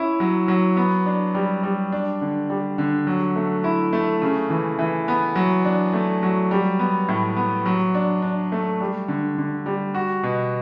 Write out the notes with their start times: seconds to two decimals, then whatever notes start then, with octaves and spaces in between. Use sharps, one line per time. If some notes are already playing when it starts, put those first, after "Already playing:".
Already playing: C#4 E4
0.20 F#3
0.48 F#3
0.77 B3
1.06 D4
1.35 G3
1.63 G3
1.92 D4
2.21 D3
2.50 G3
2.78 D3
3.07 F#3
3.36 A3
3.64 E4
3.93 A3
4.22 C#3
4.50 E3
4.79 E3
5.08 B3
5.36 F#3
5.65 D4
5.93 A3
6.23 F#3
6.51 G3
6.79 B3
7.08 A2
7.36 B3
7.66 F#3
7.95 D4
8.22 D4
8.52 A3
8.81 G3
9.08 D3
9.38 D3
9.66 G3
9.95 F#4
10.23 B2